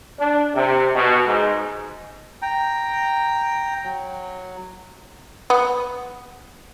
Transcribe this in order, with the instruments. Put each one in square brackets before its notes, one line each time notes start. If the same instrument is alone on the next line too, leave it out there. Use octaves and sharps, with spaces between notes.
[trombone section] D4
C3
B2
G#2
[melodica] G5 A#5
F#3
[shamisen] B3